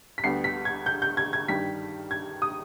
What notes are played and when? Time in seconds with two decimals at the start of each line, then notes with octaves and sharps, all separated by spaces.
0.18 B6
0.24 D2 D3 G3 B3 C7
0.44 B6
0.65 G#6
0.86 G6
1.02 G6
1.17 G#6
1.33 G#6
1.48 G2 D#3 G3 B6
2.11 G#6
2.42 D#6